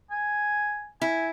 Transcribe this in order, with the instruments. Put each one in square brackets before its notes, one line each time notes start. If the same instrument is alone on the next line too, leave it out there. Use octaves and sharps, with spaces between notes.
[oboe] G#5
[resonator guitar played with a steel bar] E4 [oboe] G#5